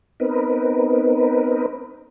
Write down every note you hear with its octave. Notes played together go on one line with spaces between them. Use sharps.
B3 C4 D#4 A#4 B4